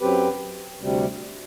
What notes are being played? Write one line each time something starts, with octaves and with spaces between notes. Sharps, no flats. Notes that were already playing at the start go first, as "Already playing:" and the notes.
F#2 F#3 C4 G4 B4
D2 C3 G3